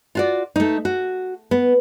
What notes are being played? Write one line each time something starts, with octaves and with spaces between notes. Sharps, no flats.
F4 F#4 D5
A3 D#4
F#4
B3